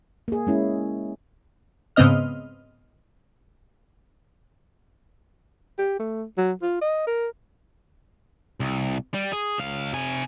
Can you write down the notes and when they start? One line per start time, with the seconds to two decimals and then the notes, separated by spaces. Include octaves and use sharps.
0.28 A#3 G#4
0.47 G#3 C#4 E4
1.96 G#2 C#3 B3 C4 D#5 F6
5.78 G4
5.99 A3
6.38 F#3
6.62 F4
6.81 D#5
7.07 A#4
8.60 C2
9.14 G3
9.33 G#4
9.58 C#2 F5
9.94 C3 G#5